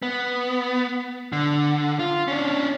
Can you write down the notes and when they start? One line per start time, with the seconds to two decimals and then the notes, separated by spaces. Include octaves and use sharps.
0.02 B3
1.32 D3
1.99 F4
2.28 C#4 D4